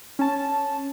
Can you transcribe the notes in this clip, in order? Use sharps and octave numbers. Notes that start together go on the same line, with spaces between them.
C#4 A5